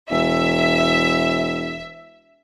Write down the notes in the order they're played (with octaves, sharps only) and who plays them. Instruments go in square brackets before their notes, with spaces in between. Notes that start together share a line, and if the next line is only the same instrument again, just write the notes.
[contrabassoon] E1 [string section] E5